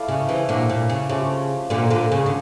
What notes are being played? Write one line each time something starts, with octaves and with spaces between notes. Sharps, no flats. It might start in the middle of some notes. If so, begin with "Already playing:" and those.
Already playing: A3 E4 A4 D5 F5
C#3
C#3 E3
A#2 D3 A#3 D4 G4 C#5
A#2
C#3
C#3 F3 A3 C#4 G4
A#2 D3 D4 F4 A#4
A#2 D3
C#3
D3